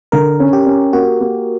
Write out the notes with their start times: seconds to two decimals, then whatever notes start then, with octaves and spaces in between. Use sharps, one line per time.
0.12 D3 A#4
0.40 C#4
0.53 G4
0.66 C#4
0.93 A#3 F#4
1.21 A#3